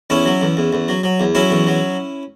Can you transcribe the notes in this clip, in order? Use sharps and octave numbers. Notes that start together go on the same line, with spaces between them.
E2 C#4 E4
F#3
E2
E2
E2
F#3
F#3
E2
F#3 C#4 E4
E2
F#3